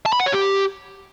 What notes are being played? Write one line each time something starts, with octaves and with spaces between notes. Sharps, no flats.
A5
B5
F#5
C#5
G4